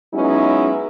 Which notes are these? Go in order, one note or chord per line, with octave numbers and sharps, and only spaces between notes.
F#3 G#3 B3 C#4 D#4 E4